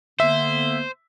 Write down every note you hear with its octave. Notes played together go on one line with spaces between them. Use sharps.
D3 A#3 B3 C5 E5